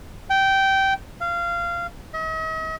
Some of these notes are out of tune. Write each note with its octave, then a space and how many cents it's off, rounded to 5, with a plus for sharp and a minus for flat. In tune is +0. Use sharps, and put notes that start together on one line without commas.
G5 -15
F5 -20
D#5 +45